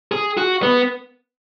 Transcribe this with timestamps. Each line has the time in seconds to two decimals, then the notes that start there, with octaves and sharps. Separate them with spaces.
0.12 G#4
0.37 F#4
0.63 B3